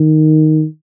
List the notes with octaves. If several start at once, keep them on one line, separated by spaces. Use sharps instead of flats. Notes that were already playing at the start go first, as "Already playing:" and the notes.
Already playing: D#3